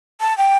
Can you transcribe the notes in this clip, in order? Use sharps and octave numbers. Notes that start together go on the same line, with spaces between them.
A5
G5